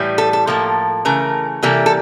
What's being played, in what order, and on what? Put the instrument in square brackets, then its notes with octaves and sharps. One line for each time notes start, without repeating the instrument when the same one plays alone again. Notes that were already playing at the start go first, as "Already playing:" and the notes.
Already playing: [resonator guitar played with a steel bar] A2 E3 G3
A4
A4
A2 F3 A#3 A4
C#3 E3 A3 A#4
C3 E3 G3 A#3 A4
A4